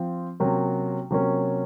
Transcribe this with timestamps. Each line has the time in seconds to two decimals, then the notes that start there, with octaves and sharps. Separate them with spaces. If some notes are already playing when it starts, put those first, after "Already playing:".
Already playing: F3 C4 F4
0.40 C3 F#3 A#3 C#4
1.11 C3 F#3 A#3 C#4